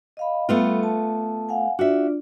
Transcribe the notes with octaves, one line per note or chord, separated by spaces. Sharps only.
D#5 F5 B5
G3 A3 B3 F4 B5
A5
F5 F#5 G#5
D4 F4 F#4 D5 E5